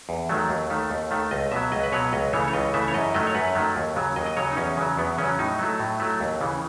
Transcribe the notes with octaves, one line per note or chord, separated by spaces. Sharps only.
E2
D#3 F#3 A3
D#2
D#3 A3
D#2
D#3 A3
C#2 D#5
B2 F#3 E5
C#2 D#5
B4
B2 F#3 C#5
C#2 D#5
C#3 E3 A3 C#5
C#5
C#2 D#5
C#3 E3 A3 E5
C#5
F#2 D#5
D#3 F#3 A3 D#5
C#5
F#2 B4
D#3 F#3 A3
D#2
C#3 F#3
D#2 D#5
D#5
C#3 F#3 C#5
D#4
E2 C#4
C#3 F#3
E2 B3
C#3 F#3 C#4
A2 D#4
F#3 A3
A2
F#3 A3
D#2
C#3 E3